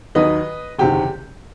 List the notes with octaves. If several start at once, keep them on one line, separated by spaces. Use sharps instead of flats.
D#2 D#3 F#3 B4 D#5
F#1 E2 C3 D#3 G4